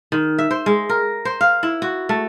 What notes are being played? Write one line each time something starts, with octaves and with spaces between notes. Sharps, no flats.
D#3
E5
C5
G#3
A#4
C5
F5
E4
F#4
A3